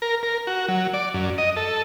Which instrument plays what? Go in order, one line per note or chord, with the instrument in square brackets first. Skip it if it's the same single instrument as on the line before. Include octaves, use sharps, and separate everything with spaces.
[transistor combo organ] A#4
A#4
F#4
F#3
D5
F#2
D#5
A4